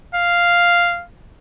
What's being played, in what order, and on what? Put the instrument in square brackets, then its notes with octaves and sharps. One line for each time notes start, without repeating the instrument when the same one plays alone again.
[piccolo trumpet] F5